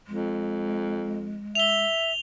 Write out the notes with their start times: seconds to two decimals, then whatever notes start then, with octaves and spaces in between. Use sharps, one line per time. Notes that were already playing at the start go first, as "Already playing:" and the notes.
0.07 F2 G#3
1.55 E5 F7 G7